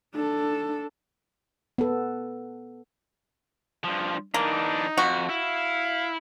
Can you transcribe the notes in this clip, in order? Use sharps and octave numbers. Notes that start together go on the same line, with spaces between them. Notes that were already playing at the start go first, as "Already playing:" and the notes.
D4 A4
B3 A4
G2 F3
E3 A#3 D4 D#4
F2 F#4
E4 F5